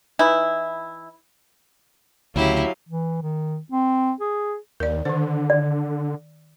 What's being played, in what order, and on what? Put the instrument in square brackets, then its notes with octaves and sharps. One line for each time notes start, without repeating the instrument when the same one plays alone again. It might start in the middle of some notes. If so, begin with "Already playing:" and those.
[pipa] E3 D#4 E4
[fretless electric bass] D2 C#3 [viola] F#3 F5 [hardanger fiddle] E4 G4
[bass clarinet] E3
D#3
C4
G#4
[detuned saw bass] D#2 [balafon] A#4 D5
[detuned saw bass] D3 [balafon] D#3 C5
[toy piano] D5